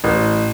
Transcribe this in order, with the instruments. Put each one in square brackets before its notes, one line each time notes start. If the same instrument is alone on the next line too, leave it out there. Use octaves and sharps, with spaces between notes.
[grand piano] A1